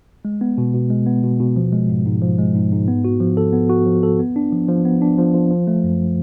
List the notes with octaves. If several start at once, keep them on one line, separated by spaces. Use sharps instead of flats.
G#3
B3
B2
B2
G#3
B3
B2
B2
F3
G#3
G#2
G#2
F3
G#3
G#2
G#2
B3
F#4
F3
A4
B3
F#4
F3
A4
B3
D4
F3
F3
B3
D4
F3
F3
F3
A3
F#2